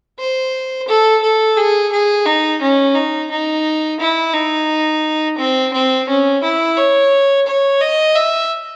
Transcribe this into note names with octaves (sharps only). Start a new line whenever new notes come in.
C5
A4
A4
G#4
G#4
D#4
C#4
D#4
D#4
E4
D#4
C4
C4
C#4
E4
C#5
C#5
D#5
E5